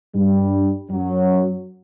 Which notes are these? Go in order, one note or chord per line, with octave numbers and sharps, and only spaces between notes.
G2 G3
F#2 F#3